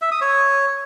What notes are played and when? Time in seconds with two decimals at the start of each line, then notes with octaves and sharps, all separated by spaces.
0.02 E5
0.11 D#6
0.21 C#5